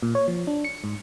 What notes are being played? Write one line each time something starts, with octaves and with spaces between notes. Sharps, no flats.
A#2
C#5
F3
D4
C#7
G#2